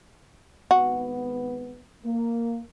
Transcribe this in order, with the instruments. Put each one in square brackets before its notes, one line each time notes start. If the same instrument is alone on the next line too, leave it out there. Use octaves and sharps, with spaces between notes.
[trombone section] G#1 B3 [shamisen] F#4
[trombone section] A#3